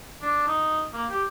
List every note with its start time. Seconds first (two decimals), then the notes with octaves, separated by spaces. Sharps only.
0.22 D4
0.47 D#4
0.93 A#3
1.10 G4